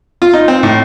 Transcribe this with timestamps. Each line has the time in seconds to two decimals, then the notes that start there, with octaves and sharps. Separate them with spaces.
0.22 F4
0.34 D#4
0.48 C4
0.63 A2